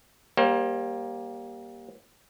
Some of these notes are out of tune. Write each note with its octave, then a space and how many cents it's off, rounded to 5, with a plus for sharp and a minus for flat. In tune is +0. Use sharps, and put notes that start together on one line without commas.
G3 +0 A#3 +20 C5 +40